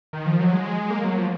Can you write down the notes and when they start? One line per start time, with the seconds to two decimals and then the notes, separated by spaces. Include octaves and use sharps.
0.13 D#3
0.26 F3
0.39 F#3
0.53 G#3
0.90 A#3
1.04 F#3
1.17 F3